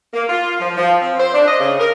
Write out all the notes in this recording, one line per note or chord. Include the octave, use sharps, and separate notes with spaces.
A#3
F4
F3
F3
C4
C5
D4
D#5
C#3
A#4